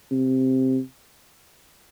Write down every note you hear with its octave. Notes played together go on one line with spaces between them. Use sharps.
C3